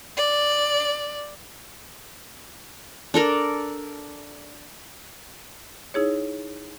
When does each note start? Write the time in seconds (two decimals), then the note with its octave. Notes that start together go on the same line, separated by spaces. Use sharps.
0.17 D5
3.14 D4 A4 A#4 D5
5.94 D#4 E4 G#4 C#5